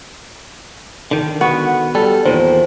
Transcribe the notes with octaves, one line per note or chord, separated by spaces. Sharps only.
D3 D#3
B3 F#4
G3 A4
E2 A#2 D#3 C5